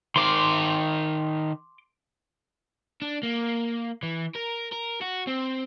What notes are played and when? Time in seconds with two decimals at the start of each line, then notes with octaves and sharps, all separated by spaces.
0.16 D#3 C5 C6 D6
3.02 D4
3.23 A#3
4.03 E3
4.36 A#4
4.73 A#4
5.02 F#4
5.27 C4